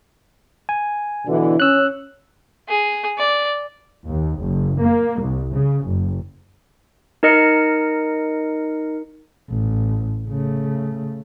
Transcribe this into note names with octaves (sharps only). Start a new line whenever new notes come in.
G#5
B2 D3 E3
C#4 E6 F#6
G#4
D5
D#2
F#1
A#3
C2
C#3
F#1
D#4 A#4 D#5 F6 C#7
A1
C#3 A3